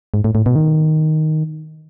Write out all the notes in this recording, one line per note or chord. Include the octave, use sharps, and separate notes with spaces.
G#2
A2
A2
B2
D#3